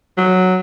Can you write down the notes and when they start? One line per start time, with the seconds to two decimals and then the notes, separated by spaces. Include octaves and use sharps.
0.18 F#3